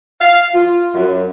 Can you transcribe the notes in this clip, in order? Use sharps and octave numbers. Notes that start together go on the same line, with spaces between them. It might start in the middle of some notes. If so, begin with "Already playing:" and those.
F5
F4
F#2